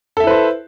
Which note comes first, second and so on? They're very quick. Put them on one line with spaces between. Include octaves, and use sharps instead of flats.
A4 E5 E4 B4 C5